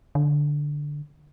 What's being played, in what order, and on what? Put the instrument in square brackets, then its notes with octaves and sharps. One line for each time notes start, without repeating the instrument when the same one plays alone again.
[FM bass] D3